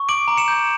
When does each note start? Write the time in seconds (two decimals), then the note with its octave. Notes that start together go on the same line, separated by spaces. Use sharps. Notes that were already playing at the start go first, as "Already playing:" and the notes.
Already playing: C#6
0.09 D6 D7 F#7
0.28 A#5
0.37 C#7 E7
0.48 G6